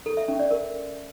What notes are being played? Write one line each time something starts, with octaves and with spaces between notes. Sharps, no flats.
A4
E5
C#4
D5
A#4